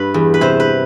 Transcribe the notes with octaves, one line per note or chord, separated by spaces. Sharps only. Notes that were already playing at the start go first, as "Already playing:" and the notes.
Already playing: G2 B4
E2
B4
C3 C5
B4